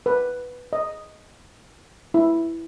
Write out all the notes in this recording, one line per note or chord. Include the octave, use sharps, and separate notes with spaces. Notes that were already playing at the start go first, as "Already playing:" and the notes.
B4
D#5
E4